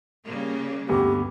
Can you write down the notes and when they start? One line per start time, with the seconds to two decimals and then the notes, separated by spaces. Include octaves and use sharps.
0.25 C#3 G3 A#3
0.89 D2 G2 B3 G4